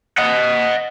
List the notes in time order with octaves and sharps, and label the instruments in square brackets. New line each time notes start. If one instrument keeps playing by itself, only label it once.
[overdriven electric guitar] D#5 F#5